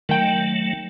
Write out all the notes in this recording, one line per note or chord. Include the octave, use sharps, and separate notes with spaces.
D#3 F#3 A3 G5